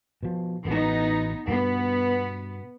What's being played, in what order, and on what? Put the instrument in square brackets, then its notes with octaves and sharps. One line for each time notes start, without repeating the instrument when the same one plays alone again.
[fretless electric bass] B2 F3
[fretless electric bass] A1 B2 [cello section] B3 D#4
[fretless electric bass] G2 B2 [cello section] B3